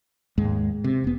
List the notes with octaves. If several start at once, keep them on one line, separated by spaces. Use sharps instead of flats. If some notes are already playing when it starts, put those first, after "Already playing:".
D#2 G#2 G#3
C3
F1 B3